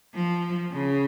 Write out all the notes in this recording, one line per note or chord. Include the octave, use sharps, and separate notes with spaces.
F3
C#3